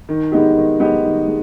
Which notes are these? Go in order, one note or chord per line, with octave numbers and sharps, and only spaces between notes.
D#3
G#3 B3 D#4 G4
D#3
G#3 B3 D#4 G4
D#3
G#3